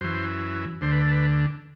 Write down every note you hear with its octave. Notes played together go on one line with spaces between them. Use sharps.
F#2 E3 C5
D2 D3 C5
B4
A4
B4